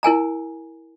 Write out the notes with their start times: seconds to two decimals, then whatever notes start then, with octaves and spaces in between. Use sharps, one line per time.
0.03 E4 A#4 G#5 A#5